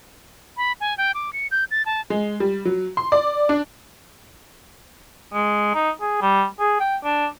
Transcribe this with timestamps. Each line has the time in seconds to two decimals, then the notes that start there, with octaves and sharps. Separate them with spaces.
0.57 B5
0.81 G#5
0.98 G5
1.14 D6
1.33 C#7
1.51 G6
1.71 A6
1.86 A5
2.10 G#3
2.40 G3
2.65 F#3
2.97 C6
3.12 D5
3.49 D4
5.33 G#3
5.74 D#4
6.01 G#4
6.21 G3
6.60 G#4
6.80 G5
7.04 D4